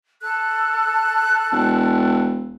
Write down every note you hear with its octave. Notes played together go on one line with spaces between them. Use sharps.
A4 A5 F#6
E1